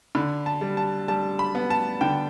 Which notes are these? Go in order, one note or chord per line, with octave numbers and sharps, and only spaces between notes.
D3 B5
A5
G3
A5
G3 A5
B5
B3
A5
D3 G5